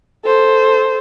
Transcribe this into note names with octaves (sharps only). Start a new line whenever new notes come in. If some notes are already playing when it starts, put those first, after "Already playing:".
A4 C5